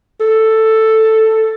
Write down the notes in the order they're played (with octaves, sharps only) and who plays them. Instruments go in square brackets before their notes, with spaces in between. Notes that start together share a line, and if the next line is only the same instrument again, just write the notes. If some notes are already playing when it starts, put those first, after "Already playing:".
[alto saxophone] A4